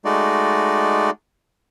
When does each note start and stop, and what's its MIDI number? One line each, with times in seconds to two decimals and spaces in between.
0.05 1.10 56
0.05 1.10 57
0.05 1.10 63
0.05 1.10 66
0.05 1.10 74